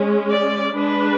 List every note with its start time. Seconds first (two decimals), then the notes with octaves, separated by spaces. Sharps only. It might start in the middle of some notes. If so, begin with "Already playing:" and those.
Already playing: G#3 C#4
0.30 D5
0.74 G#3 D4 B4